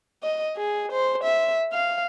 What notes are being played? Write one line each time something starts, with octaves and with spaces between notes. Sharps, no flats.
D#5
G#4
C5
E5
F5